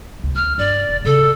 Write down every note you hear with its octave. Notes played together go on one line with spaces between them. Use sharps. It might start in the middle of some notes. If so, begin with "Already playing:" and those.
F1 D2
D2 F6
G2 F4 D5
E1
C#3 A4